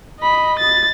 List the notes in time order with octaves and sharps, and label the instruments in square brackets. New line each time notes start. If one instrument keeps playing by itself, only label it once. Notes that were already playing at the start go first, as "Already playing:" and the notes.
[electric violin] D#5 B5
A6